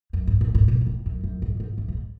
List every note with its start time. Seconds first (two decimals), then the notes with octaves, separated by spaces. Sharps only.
0.13 F#2
0.27 G#2
0.41 A2
0.55 G#2
0.68 B2
0.81 B2
0.87 A2
1.06 F#2
1.24 F#2
1.42 G#2
1.60 G#2
1.78 F#2
1.88 G#2